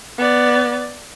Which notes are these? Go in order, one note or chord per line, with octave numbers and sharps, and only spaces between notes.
B3 D5